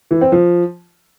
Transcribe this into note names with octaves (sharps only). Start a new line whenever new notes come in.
E3
C4
F3